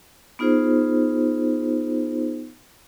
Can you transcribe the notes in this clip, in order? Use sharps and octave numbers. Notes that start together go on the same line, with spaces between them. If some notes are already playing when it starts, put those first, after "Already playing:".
B3 D#4 F4 G#4 C5